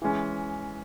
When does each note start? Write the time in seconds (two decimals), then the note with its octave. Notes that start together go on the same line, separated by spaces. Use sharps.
0.02 E3 G#3 C#4